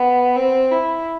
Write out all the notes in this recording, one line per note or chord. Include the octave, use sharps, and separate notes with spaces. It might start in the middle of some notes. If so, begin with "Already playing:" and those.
Already playing: B3
C4
E4